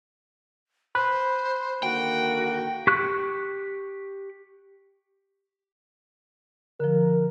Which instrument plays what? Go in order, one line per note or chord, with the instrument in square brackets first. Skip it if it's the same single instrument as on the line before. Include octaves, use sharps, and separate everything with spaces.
[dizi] C5 [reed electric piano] B5 F#6
[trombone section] D3 D#3 A#3 [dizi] F#4 [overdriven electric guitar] G5
[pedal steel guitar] G4 C#6 F#6
[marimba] D3 F3 [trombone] A#4